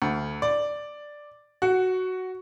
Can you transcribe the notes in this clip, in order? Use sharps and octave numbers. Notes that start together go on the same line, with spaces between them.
D2
D5
F#4